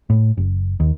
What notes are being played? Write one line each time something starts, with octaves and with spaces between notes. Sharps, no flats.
A2
F#1
D#2